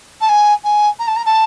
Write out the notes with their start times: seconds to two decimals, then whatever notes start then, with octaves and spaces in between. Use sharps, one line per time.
0.21 A5
0.29 G#5
0.64 G#5
0.99 A#5
1.07 A5
1.16 A#5
1.26 A5